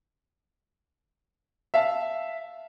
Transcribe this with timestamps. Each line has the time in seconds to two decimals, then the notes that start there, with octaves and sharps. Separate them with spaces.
1.74 E5 F5 A5